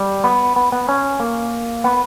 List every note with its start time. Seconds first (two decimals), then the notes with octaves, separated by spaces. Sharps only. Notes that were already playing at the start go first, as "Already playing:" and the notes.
Already playing: G3
0.24 B3
0.56 B3
0.72 B3
0.89 C#4
1.20 A#3
1.84 B3